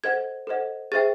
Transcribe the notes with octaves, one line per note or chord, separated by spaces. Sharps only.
A4 C5 D#5 F#5 G#6
A4 C5 D#5 F#5
G#4 C5 E5 G5 A6